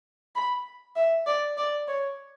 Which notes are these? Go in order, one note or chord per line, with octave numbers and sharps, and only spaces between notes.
B5
E5
D5
D5
C#5